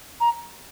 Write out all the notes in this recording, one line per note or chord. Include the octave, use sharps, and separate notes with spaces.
A#5